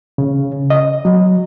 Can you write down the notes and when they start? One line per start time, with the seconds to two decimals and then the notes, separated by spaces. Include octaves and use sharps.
0.18 C#3
0.70 D#5
1.05 F#3